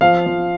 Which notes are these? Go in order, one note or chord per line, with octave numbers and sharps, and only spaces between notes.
F3 F5
F3